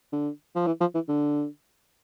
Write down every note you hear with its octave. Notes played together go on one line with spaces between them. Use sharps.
D3
F3
E3
F3
E3
D3